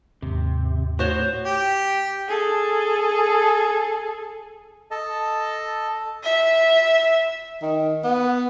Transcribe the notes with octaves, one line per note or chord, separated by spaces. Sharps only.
D#2 G#2 C3
A2 F#4 C5 C#5
G4
G#4 A4
A4 D#5 A5
E5
D#3
B3